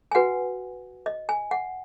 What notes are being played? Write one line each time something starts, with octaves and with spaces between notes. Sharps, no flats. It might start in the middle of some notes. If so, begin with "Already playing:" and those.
G#5
F#4 B4 F#5
D#5
G#5
F#5